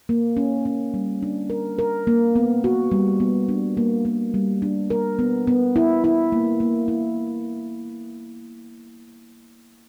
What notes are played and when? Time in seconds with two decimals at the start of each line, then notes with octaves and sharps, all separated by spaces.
0.09 A#3
0.37 C#4
0.65 C#4
0.94 G3
1.22 D4
1.50 A#4
1.79 A#4
2.07 A#3
2.35 B3
2.64 F#4
2.91 G3
3.20 B3
3.49 D4
3.77 A#3
4.05 A#3
4.34 G3
4.62 D4
4.90 A#4
5.19 B3
5.47 B3
5.76 E4
6.04 E4
6.32 A#3
6.60 A#3
6.88 E4